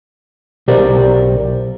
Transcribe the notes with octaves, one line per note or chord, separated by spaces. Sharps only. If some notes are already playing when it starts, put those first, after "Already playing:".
B1 G4 A#4 C5 D5